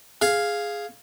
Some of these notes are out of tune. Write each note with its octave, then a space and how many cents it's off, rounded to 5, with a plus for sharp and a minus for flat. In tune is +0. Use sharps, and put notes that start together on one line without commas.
G#4 +0 F5 +0